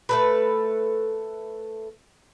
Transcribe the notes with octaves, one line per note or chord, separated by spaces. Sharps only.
A3 A4 B4